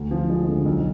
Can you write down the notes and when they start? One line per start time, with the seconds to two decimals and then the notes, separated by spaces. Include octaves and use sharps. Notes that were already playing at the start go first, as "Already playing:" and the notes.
Already playing: D2
0.11 F3
0.30 G#3
0.48 D3
0.65 B1